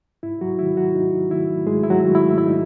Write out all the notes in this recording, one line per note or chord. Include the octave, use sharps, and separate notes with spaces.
G#2 E4
F#3 F#4
D#3 A3 E4
F#3 F#4
G#2 D#4
D#3 A3 E4
G#2 G#3 G#4
E4
F#3 F#4
D#3 A3
E4
G#2 E4
D#4